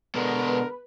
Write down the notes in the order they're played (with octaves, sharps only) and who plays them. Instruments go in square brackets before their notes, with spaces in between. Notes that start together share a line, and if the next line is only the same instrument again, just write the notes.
[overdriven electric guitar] B2 G#3 [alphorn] D3 [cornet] A#4 [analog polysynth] B4